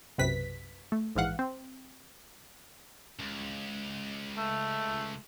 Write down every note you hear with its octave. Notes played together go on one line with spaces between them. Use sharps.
B1 F#2 C3 B4 B6
A3
A#1 G#2 E3 F5 F#5
C4
C#2
A3